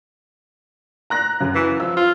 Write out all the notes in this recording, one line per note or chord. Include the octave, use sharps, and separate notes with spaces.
A#5 F#6 A#6
F#2 C#3
E3
F3 E6
F4